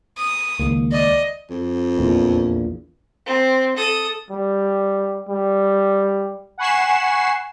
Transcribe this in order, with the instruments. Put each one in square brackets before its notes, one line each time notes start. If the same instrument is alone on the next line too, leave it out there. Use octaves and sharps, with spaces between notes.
[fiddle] D#6
[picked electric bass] C#2 [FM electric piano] D#3 G#3 A#3
[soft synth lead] D5 [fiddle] D#5
[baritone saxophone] F2
[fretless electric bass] A#1 E2 A#2
[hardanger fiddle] C4
A4 D#6
[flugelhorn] G3
G3
[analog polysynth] F#5 G#5 B5 C#6 C7 E7